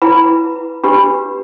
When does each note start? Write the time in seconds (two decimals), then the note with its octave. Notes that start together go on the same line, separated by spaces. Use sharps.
0.02 E4 B4 B5
0.83 D4 G4 B4 B5